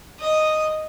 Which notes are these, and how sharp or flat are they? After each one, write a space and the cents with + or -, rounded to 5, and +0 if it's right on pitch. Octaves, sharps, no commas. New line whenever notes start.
D#5 -5 D#6 +0